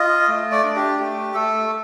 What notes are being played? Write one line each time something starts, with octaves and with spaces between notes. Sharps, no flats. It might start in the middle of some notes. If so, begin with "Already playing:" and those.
Already playing: F4 D#5
A3
D5
D4
G4
A3 G4
A3 A4